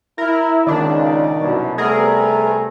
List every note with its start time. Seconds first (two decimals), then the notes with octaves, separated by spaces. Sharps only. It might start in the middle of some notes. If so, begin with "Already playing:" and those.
0.18 E4 A#4
0.67 C#2 A#2 D#3 D4
1.39 C2 F#2 B2
1.78 C3 G3 A3 B3 G#4 A#4